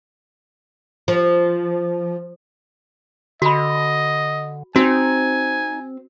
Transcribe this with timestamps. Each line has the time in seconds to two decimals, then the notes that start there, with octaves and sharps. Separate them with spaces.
1.08 F3
3.42 D3 F#4 D#5 B5
4.76 C4 D#4 F#4 G#5